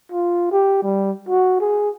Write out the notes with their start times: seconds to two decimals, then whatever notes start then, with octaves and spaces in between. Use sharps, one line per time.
0.12 F4
0.52 G4
0.83 G3
1.29 F#4
1.60 G#4